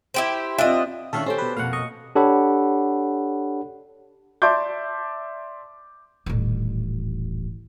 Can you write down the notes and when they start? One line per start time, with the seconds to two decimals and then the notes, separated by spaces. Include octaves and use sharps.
0.14 E4 G4 C5
0.58 C4 D4 F4 D#5 E5
1.13 D#3 C#4 D4 A4 E5 F5
1.26 C#4 G4 A4 C5
1.38 B2 B4
1.57 F2 B2 A#3 F5 F#5
1.73 D#5 C#6
2.15 D4 G4 A4 C#5 F#5 B5
4.42 D5 E5 A5 C6 D6 G6
6.26 D#1 A1